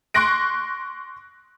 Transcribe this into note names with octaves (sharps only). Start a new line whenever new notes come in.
C6 C#6 F#6 A#6 D7